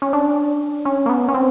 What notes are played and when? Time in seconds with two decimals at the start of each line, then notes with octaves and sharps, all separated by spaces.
0.02 C#4
0.13 D4
0.85 C#4
1.06 A#3
1.09 B3
1.28 C#4
1.34 C4